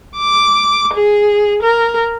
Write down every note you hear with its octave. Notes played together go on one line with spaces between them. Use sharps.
D6
G#4
A#4